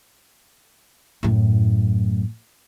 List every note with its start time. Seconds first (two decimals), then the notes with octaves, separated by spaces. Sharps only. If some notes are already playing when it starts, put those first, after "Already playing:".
1.23 F#2 A2